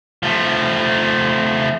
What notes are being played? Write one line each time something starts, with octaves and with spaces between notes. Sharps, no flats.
F3 A3